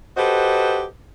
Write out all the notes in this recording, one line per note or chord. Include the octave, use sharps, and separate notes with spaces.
F#4 G4 A4 B4 C5 D#5